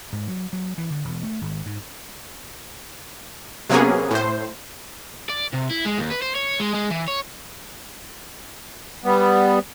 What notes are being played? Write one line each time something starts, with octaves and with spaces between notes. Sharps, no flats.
G#2
F#3
F#3
E3
D3
E1
A3
G#1
G#2
C3 F#3 A#3 B3 C#4 G#4
A2 C5
D5
C3
E4
G#3
D#2
B4
C5
C#5
G#3
G#3
E3
C#5
G3 B3